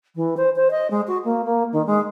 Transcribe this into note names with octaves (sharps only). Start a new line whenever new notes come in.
E3
C5
C5
D#5
G#3
F#4
A#3
A#3
D#3
G#3